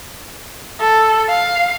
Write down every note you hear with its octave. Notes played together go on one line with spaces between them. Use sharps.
A4
F5